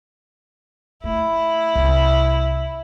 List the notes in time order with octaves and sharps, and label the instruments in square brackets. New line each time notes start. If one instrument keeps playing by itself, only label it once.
[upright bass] A3 [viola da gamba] E4
[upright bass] C2